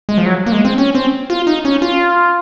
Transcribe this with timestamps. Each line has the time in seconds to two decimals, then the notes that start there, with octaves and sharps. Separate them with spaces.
0.09 G#3
0.18 F3
0.26 F#3
0.46 A#3
0.52 G#3
0.65 C4
0.78 C#4
0.95 C4
1.30 F4
1.47 D#4
1.65 C#4
1.82 F4